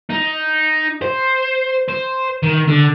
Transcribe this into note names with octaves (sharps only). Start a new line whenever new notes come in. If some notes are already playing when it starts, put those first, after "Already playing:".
D#4
C5
C5
D#3
D3